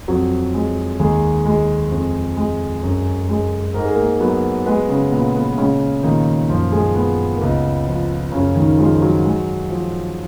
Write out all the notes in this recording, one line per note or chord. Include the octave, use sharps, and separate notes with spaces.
F2 F#3 F#4
G#3
D#2 G#3 G#4
G#3
F2
G#3
F#2
G#3
G#2 A#4
G#4
A#3 A#4
F#3 B3 B4
G#3 B3 B4
C#3 C#4
A#2 B3
B3
C#3 G#3 C#4
A#2 D#3 D#4
F#2 F3 F4
G#3 G#4
G#3 B3
A#3
C#2 B3
F3
F#2 C#3 C#4
D#3 D#4
F3 G#3 F4
F#3 F#4
G#3
F3